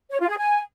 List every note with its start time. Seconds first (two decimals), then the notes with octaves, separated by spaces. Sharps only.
0.11 C#5
0.20 F4
0.29 G#4
0.38 G#5